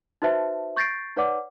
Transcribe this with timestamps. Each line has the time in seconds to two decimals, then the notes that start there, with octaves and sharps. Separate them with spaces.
0.22 D#4 F#4 B4 C5 E5 A5
0.76 C#6 G6 A6 A#6 C7 D7
1.16 D#4 B4 C#5 D5 F#5 D6